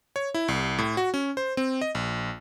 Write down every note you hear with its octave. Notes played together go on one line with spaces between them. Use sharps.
C#5
E4
C2
A2
F#4
C#4
C5
C4
D#5
A#1